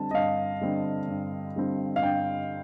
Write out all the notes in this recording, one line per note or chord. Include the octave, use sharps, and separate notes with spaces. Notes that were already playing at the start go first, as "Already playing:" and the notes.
Already playing: D3 G3 C4 A5
D#5
G2 F5
D3 G3 C4
G2
D3 G3 C4
F5
G2 G5